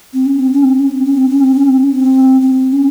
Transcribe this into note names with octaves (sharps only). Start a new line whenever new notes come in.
C4
C#4
C4
C#4
C4
C#4
C4
C#4
C4
C#4
C4
C#4
C4
C#4
C4
C4
C#4